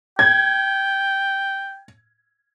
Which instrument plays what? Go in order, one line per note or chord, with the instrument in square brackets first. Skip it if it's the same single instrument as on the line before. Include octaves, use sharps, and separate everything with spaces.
[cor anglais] G5 [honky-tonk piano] G#6